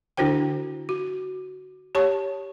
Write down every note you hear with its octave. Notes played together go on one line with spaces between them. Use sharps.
D3 D4 E4 F#4 C5 G5
F#4
G4 C#5 A5 C#6